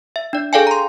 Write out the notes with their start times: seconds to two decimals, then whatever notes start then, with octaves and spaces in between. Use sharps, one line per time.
0.16 E5
0.33 D4 D5
0.53 G#4 A4 D5 F5 G5 G#5
0.67 A#5 C6